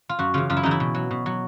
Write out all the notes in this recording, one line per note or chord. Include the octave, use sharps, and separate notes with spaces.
F4
F#2 F#4
C#3 E3 F4
F#2 F4
E4
C#3 E3 D#4
E4
B2
F#3
B2
F#3